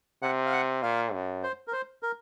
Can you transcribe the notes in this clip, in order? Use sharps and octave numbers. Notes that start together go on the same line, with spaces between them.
C3 F#5
F5
F#5
A#2 F5
F#2
C5
A#4
C5
A#4